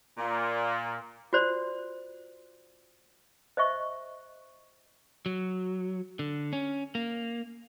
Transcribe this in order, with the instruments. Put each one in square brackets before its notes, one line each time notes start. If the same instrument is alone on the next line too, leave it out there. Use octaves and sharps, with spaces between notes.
[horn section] A#2
[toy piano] F4 F#4 C5 D5
C5 D#5 E5 C#6
[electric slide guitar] F#3
D3
C#4
A#3